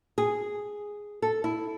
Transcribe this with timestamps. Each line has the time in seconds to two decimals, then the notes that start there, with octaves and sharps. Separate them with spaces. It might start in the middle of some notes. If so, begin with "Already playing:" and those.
0.18 G#4
1.22 A4
1.44 E4